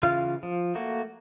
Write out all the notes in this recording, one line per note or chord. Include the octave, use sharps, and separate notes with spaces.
C#3 E3 F4 F5 F6
F3
A3 A#3 F#4